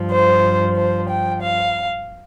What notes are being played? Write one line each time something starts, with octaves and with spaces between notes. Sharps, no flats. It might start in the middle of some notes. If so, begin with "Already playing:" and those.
Already playing: G2 F3
C5
C5
G5
F5